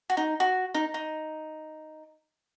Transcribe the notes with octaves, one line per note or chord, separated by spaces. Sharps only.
F#4
D#4
F#4
D#4
D#4